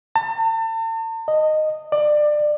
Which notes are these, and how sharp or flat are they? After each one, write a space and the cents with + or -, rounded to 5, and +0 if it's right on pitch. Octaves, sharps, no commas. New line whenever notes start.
A5 +40
D#5 -10
D5 +25